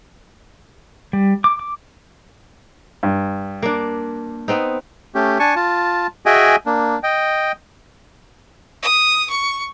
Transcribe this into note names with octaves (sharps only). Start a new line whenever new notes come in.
G3
D6
D6
G2
A#3 D4
B3 C4 D#4
A3 C#4 G4
D4 G#5 A5 C#6
F4 A5
F#4 G#4 D#5 E5 G5 G#5
A#3 D4
D#5 G5
D#6
C#6